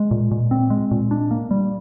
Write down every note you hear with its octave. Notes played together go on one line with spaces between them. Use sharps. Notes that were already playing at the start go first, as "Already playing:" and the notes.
Already playing: G#3
A#2
A#2
C4
G#3
A#2
D4
A#3
G3